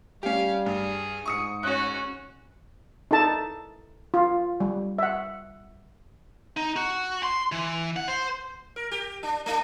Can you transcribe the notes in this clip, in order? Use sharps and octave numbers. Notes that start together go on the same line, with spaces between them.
G3 C#4 G4 F5
G2 G#4
G#2 C#6 D#6 C#7
C#4 F#4 C#5 F#6
D#4 E4 A4 A5
F4
G3
E5 F#5
D#4
F#4
C6
E3
F#5
C5
A#4
G4
D4
A3 D4